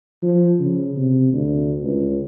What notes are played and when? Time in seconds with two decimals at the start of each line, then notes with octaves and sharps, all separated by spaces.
0.22 F3
0.59 C#3
0.96 C3
1.33 D2
1.83 C#2